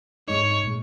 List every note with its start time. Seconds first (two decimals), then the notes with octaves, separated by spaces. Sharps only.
0.28 G#2 G#3 D#4 C#5
0.64 A#2 G#3